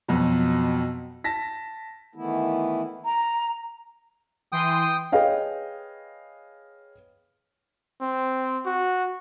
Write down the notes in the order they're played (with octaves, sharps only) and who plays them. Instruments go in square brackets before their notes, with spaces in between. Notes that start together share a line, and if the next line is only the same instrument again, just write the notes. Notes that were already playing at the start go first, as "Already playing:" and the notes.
[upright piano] F2 B2 F#3
A5 A#6 B6
[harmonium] D#3 E3 A3 B3 E4
[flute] A#5
[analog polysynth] E3 C6 D#7 [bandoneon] G5 D#6
[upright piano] G#4 B4 C#5 D#5 F5 G5
[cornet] C4
F#4